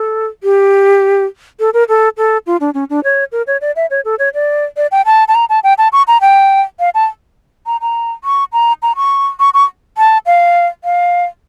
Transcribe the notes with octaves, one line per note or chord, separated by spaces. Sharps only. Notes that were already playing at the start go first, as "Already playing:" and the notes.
Already playing: A4
G4
A4
A#4
A4
A4
F4
D4
C#4
D4
C#5
A#4
C#5
D5
E5
C#5
A4
C#5
D5
D5
G5
A5
A5
A#5
A5
G5
A5
C#6
A#5
G5
F5
A5
A#5
A#5
C#6
A#5
A#5
C#6
C#6
C#6
A5
F5
F5